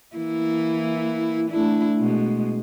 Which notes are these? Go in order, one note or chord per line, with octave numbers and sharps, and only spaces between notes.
E3 A#3 E4
A3 D4 E4
B2 G#3